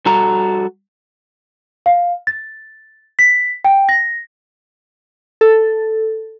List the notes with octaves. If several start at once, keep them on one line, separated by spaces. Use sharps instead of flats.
G3 F#4 A4 A#5
F5
A6
B6
G5
A#6
A4